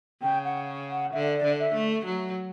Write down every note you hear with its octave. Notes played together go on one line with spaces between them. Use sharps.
C#3 G5
F#5
F#5
D3 E5
D5
D3
E5
A3
F#3